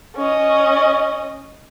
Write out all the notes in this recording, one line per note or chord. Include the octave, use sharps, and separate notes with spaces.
C#4 D#5